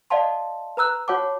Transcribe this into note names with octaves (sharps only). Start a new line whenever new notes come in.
D5 D#5 F5 F#5 A5 C6
B4 A#5 E6 F#6
F#4 C#5 F#5 A5 D6